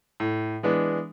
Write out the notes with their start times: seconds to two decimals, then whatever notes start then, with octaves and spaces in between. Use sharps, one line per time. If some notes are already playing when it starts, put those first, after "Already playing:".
0.20 A2
0.63 E3 G#3 B3 D4